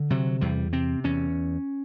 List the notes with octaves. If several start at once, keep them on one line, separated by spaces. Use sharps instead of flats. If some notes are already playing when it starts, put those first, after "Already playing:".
Already playing: D3
C3 F#3
E2 G3
C3 C4
E2 C#4